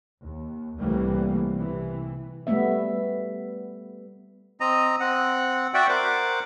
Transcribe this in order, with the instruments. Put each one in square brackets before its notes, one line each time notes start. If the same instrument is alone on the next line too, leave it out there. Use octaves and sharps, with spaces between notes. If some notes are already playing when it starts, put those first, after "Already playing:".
[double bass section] D#2
C2 A2 E3 G3 A#3
C3 E3
[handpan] G3 A3 B3 E5
[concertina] C4 D#5 A#5
C4 F#5
F#4 D5 E5 F#5 G5
A#4 C5 F#5 D6